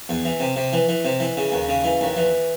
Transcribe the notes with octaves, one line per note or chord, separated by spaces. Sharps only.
E2
E3
C3
C3
E3
E3
C3
E3
C#3
D#2
C#3
E3
D#2
E3